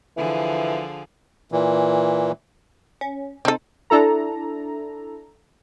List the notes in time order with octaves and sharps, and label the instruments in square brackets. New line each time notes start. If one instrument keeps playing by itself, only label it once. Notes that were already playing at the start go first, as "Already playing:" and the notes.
[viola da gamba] D3 F3 G#4 [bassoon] E3
[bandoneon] A#2 E3
[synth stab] C#4
[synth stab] C3 D#4 [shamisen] C4 A4
[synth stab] D4 E4 A4 A#5